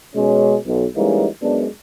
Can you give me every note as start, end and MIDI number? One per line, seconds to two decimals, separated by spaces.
0.15 0.57 47
0.15 0.57 56
0.15 0.57 61
0.66 0.85 35
0.96 1.26 52
0.96 1.26 55
0.96 1.26 56
0.96 1.26 58
0.96 1.26 61
0.96 1.26 63
1.42 1.66 42
1.42 1.66 56
1.42 1.66 59
1.42 1.66 62